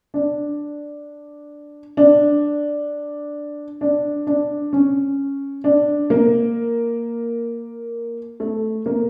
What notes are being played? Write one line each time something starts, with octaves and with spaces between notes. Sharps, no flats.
D4
D4
D4
D4
C#4
D4
A#3
A3
A#3